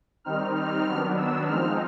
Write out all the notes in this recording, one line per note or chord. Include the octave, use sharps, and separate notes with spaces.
D#3 G3 C4 D#4 F6
F6
D#3 F#3 B3 D4
E6
F3 G#3 C4 D#4 F6